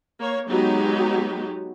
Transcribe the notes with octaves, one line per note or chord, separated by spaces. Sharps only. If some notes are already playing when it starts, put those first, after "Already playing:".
A#3 C#5
F#3 G#3 B3 D#4 F#4 G4